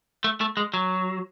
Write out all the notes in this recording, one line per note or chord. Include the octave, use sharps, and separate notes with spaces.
A3
A3
G#3
F#3